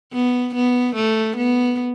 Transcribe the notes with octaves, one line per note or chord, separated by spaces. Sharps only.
B3
B3
A3
B3